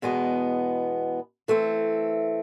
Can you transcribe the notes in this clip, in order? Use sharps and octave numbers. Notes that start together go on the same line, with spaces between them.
E2 B2 G#3 B3
E3 A3 C4